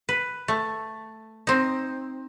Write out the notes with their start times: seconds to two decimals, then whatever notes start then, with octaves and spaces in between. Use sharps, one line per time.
0.09 B4
0.48 A3
1.47 C4 D#4